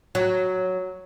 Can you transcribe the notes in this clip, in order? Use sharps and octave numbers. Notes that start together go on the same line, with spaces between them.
F#3